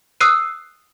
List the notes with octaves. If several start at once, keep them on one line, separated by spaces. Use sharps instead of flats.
D#6 E6 F#6 C7 D#7